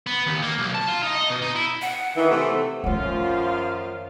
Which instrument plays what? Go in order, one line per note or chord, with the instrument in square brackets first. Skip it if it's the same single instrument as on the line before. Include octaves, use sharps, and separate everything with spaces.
[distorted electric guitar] B3
D#2
A#3
B1
A5
F4
D#4
D#5
B2
D#4
E4
[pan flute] F#5
[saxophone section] D#3 E3
C3 E3 A3
[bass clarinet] F#2 [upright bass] D#3 A3 [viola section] F3 F4 F5 [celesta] C#5 F#5